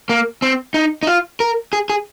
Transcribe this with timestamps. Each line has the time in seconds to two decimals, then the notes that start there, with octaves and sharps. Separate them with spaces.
0.09 A#3
0.42 C4
0.74 D#4
1.03 D#4
1.07 F4
1.40 A#4
1.73 G#4
1.90 G#4